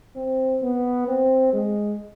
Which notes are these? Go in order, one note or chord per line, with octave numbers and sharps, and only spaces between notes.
C4
B3
C4
G#3